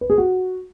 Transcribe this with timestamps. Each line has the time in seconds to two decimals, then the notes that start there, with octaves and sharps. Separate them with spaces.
0.01 B4
0.10 G#4
0.18 F#4